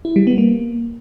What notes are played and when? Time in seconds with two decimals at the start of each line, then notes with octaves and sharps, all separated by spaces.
0.05 E4
0.16 G3
0.27 B3
0.38 A#3